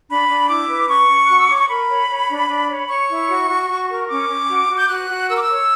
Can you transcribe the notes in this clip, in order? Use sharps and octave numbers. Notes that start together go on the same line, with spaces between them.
D4 B5
D4
E4 D6
B4
C#4 C#6
C#4
F#4 F#6
E6
C#5 D6
C#6
A#4 B5
C#5
C#5
D4
D4
C#5
C#5 C#6
E4
F#4
F#4
F#4
A#4
C#4 D6
C#4
F#4
F#4
G6
F#4 F#6
F#4
A#4 E6
D6
E6
C#5